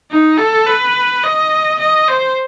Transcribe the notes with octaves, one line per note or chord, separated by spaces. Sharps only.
D#4
A4
B4
D#5
D#5
C5